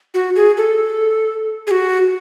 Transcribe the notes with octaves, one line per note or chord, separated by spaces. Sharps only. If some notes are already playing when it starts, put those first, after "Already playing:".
F#4
G#4
A4
G#4
F#4